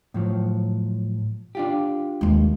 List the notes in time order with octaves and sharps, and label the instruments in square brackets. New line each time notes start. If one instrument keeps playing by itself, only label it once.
[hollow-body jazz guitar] A2 F3 F#3
D4 F4 G4
[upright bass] D#2 G#3